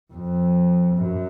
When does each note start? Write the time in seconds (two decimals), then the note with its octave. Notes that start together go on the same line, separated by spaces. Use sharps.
0.13 F2
0.95 F#2